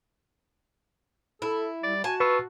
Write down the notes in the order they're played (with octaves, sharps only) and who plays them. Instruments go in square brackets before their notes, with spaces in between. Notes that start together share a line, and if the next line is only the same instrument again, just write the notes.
[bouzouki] E4 [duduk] A4
[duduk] G3 [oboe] D5
[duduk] F#4 [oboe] G#5 [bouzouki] A5
[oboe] F4 [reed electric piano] B4 C#6 E6